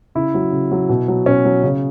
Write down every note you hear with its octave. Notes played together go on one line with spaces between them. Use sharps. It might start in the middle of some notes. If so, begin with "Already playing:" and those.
C#3 E4
F#3
C#3
F#3
B2
F#3
B2 C#4
F#3
C#3